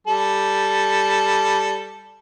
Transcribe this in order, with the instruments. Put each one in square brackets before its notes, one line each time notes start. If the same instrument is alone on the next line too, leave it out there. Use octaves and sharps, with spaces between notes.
[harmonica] G3 A4